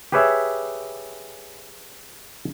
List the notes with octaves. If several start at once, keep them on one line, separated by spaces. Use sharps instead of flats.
G4 G#4 B4 C#5 E5